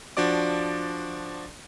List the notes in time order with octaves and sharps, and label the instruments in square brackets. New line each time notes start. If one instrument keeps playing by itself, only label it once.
[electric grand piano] F3 D4 F#4 D5 D6